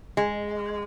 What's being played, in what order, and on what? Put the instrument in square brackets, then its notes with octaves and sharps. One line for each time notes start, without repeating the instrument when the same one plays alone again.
[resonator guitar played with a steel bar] G#3